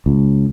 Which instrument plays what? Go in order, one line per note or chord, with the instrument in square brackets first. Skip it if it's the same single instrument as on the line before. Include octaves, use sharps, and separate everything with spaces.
[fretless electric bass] C#2